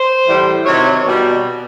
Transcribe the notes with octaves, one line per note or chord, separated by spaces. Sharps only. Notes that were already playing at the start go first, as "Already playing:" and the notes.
Already playing: C5
A2 E3 G3
C3 D#3 F#3 C#5
B2 G3